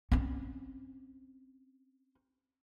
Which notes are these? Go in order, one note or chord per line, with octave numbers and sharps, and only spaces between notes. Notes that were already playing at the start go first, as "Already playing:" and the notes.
C4 C#4